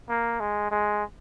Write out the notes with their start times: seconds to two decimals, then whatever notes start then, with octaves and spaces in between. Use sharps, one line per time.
0.09 A#3
0.40 G#3
0.71 G#3